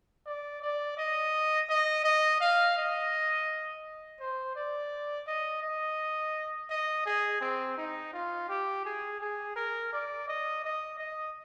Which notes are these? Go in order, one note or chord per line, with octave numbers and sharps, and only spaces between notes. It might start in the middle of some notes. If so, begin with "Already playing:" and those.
D5
D5
D#5
D#5
D#5
F5
D#5
C5
D5
D#5
D#5
D#5
G#4
C4
D#4
F4
G4
G#4
G#4
A#4
D5
D#5
D#5
D#5